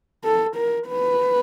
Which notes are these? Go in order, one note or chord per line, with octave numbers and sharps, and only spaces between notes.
A4
A#4
B4